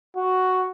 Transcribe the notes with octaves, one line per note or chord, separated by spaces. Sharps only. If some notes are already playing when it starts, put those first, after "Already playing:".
F#4